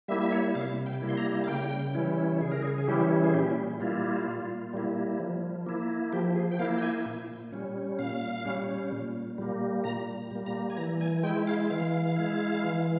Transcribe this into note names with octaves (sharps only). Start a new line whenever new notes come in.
G3 A#3 E4 E5
E5
C#5
C3 F5
G5
G3 A#3 E4
C6
A#5
F5
C#3 G5
E3 G3 C#4 E4
C#3 G#4
A#4
G#4
G#4
E3 G3 C#4 E4 G4
G#4
A#2 G4
G3 A#3 E4 F4
A#2
G3 A#3 E4
F3
A#3 E4
F3 G4
G#4
G5
A#3 E4 F5
G5
G#5
A#2
G3 C#4
A#2 F5
G3 C#4
A#2
G3 A#3
A#2 A#5
G3 A#3
A#5
G#5
E3 A#5
G#5
G#3 E4 G5
F5
E3 F5
G#3 E4
E3